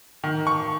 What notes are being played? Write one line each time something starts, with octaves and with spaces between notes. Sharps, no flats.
D#3
C#6